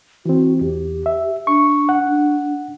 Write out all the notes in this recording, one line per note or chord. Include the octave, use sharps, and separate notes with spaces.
E3 C4 F#4
E2 G4
E5
D4 C#6
F#5
D4